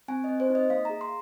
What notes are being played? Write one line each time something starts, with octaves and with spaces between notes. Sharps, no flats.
C4 G#5
C4 D#5
C5
D#4
D#5
A#3 F5
G#4 A#5
C6